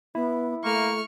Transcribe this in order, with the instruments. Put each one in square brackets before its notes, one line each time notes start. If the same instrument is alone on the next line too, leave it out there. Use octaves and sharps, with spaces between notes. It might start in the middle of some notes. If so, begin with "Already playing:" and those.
[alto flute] B3 [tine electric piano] E4
[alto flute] A3 [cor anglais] A#3 [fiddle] C#6 F6